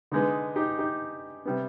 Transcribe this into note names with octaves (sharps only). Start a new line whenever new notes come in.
D3 G#3 B3 D#4
D#4 G4
D#4 G4
C3 G3 B3